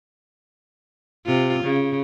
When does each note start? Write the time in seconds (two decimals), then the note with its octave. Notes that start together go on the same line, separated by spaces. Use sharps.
1.26 C3 F4
1.64 C#3